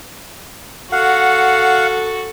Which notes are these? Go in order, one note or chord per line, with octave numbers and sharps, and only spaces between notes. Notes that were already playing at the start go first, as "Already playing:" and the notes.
F#4 A4 F5 F#5